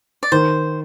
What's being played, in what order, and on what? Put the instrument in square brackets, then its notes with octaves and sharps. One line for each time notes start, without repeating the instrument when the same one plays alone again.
[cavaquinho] D5
[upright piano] D#3 [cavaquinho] C5